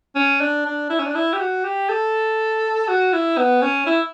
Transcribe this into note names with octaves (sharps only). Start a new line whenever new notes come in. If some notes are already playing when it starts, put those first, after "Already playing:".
C#4
D4
D4
E4
C#4
D4
E4
G4
F#4
G4
A4
F#4
E4
B3
C#4
E4